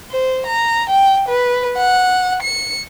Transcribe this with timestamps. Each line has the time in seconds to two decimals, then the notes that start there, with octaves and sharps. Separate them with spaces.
0.11 C5
0.47 A#5
0.90 G5
1.29 B4
1.78 F#5
2.43 C#7